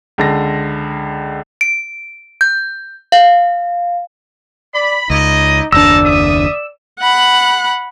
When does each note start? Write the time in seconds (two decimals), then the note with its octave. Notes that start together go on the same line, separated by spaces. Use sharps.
0.18 C#2 D3 A#6
1.61 D7
2.41 G6
3.12 F5
4.75 D5 B5
5.10 C#2 D#4 E4 D5 D#5
5.72 F#1 D#2 D4 D#4 D5 A5 A#5 E6
6.04 E5 D#6
7.00 F#5 B5